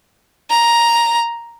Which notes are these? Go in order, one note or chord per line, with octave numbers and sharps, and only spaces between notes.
A#5